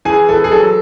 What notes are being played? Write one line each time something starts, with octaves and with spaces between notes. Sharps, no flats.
E3 G#4 G#5
E3 A4
G#4
F#3 A4